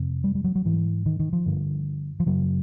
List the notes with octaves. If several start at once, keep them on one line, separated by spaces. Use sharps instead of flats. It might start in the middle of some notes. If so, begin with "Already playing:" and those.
Already playing: F2 C3
G3
G3
F#3
F#3
G#2 E3
D#3
D#3
F3
G2 D3
F3
F#2 C#3 F#3